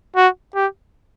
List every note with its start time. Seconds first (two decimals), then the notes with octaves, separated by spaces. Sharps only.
0.16 F#4
0.55 G4